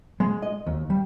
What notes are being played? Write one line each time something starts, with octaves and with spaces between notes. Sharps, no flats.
G#3
D#5
D#2
G3